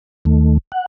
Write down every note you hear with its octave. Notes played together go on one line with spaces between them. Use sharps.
D#2 D#3 A3
F#5